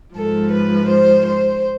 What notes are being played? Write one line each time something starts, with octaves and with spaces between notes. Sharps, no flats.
G#2 F3 A4
B4
C5
C5